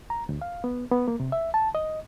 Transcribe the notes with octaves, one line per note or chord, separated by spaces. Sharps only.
A#5
D2
F5
B3
B3
A#3
C3
E5
A5
D#5